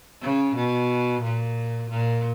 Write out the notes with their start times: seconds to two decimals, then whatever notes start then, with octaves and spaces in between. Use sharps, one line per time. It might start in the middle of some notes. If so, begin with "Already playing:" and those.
0.21 C#3
0.55 B2
1.22 A#2
1.89 A#2